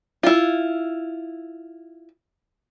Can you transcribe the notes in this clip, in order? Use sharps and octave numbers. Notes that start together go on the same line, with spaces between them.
E4 F4